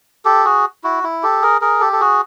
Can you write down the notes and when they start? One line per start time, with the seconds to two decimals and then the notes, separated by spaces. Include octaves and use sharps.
0.25 G4 A4
0.45 F#4 G#4
0.84 E4 F#4
1.04 E4
1.23 G4 A4
1.42 G#4 A#4
1.61 G#4 A#4
1.81 G4 A4
1.93 A4
2.01 F#4 G#4